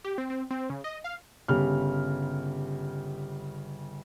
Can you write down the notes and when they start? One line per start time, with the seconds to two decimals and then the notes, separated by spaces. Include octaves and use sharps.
0.04 G4
0.18 C4
0.30 C4
0.51 C4
0.70 C#3
0.84 D#5
1.04 F5
1.48 G1 C#3 G3 F6